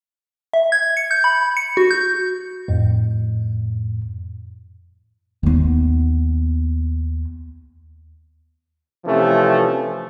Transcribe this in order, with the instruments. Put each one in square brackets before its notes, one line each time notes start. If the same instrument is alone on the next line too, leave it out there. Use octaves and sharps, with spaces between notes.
[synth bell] E5
G#6
C#7
G6
B5
C#7
F#4
G6
[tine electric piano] F2 A2
[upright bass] D#2 B3
[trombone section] C3 E3 F3 A3 C#4